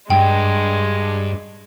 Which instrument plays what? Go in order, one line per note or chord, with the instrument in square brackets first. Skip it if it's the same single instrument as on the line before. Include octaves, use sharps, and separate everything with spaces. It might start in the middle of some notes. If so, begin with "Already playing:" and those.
[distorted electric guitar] G2 [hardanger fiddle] G#3 [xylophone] G5